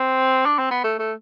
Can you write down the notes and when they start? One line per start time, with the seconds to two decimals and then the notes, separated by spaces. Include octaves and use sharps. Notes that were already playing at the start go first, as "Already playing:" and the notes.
Already playing: C4
0.46 D4
0.58 C4
0.71 B3
0.84 A3
0.99 A3